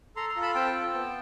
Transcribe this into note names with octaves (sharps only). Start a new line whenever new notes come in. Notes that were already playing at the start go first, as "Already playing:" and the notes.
A4 A#5 C6
A#5 C6
F4
A5 B5
C4 G5 A5
A4
B3